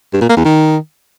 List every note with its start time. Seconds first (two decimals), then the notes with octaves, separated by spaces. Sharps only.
0.13 G2
0.21 A#2
0.29 A#3
0.37 E2
0.45 D#3